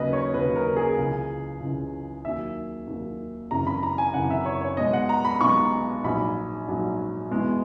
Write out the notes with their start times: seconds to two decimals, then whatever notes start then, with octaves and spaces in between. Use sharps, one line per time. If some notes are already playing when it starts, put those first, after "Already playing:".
Already playing: D#2 C#3 F#3 B4 D#5
0.13 C#5
0.34 D#2 C#3 F#3 B4
0.56 A#4
0.76 G#4
0.97 C#2 C#3 E3
1.61 C#2 C#3 E3
2.25 D#2 D#3 F#3 E5
2.87 D#2 D#3 F#3
3.51 G#1 F#2 C#3 E3 A#5
3.67 B5
3.83 A#5
3.98 G#5
4.14 G#1 F#2 C#3 E3 F#5
4.30 E5
4.46 C#5
4.61 C#5
4.77 B1 B2 G#3 D#5
4.93 F#5
5.09 A#5
5.25 B5
5.41 B1 B2 G#3 C#6
6.04 A#1 G#2 F#3 B5
6.68 A#1 G#2 F#3
7.31 E2 B2 G#3